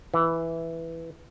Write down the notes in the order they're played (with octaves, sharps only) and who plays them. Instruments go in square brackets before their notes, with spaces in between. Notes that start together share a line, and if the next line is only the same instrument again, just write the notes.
[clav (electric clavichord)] E3